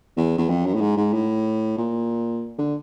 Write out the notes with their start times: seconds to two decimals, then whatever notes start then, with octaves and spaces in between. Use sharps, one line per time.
0.17 E2
0.38 E2
0.49 F2
0.66 F#2
0.75 A2
0.81 G#2
0.97 G#2
1.13 A2
1.78 A#2
2.59 D3